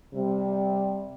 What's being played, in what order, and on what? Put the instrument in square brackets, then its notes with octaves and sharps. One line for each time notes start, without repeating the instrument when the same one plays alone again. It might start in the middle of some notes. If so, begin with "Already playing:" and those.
[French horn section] C3 G3